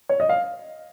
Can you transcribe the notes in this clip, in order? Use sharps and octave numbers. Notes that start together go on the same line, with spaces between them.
C#5
D#5
F5